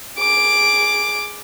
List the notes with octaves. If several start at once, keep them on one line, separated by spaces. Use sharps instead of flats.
G#4 D6